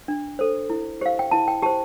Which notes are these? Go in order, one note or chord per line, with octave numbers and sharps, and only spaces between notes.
D4
A4 C5
E4
G4 C5 F5
G5
E4 A5
G5
G4 C5 A5